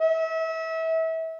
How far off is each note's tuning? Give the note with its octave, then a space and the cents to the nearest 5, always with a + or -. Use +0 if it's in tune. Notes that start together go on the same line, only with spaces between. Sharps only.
E5 -30